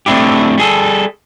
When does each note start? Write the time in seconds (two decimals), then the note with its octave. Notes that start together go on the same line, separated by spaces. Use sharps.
0.06 A3 C4 D4 E4 G4
0.58 G3 G#4 A4